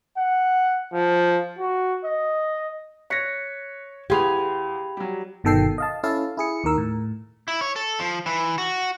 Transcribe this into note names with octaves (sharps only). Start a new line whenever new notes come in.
F#5
F3
F#4
D#5
C#5 F#6 A#6 B6 C#7
E2 G4 G#4 F5 B5 C6 G#6 F7
F#3 G3
G1 B2 D#3 A4 G5 C7
D#5 F5 A5
C#4 E4 A4 F5 A5
E4 G#4 C#7
D#2 D#3 A#4 E6
A2
E4
C#5
A4
F3
E3
F#4